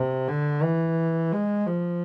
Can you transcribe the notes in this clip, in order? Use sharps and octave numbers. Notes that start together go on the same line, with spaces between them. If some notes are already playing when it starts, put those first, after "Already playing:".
Already playing: C3
D3
E3
G#3
F3